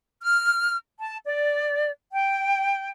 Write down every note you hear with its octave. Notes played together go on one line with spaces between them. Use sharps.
F6
A5
D5
G5